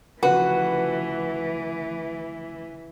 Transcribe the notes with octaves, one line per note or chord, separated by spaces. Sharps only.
D2 C#3 E3 F3 F#4 B4